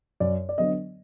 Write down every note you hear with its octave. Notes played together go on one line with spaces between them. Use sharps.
F#2 D5
D5
D3 F#3 B3 D#5